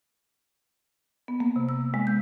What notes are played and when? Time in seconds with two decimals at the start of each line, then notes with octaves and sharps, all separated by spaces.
1.28 B3
1.40 A#3
1.56 C3
1.69 E6
1.94 G#3
2.07 G6